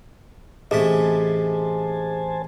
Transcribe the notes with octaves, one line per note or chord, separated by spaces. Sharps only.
A1 C3 A3 G#4 C5 D#5 G#5 A5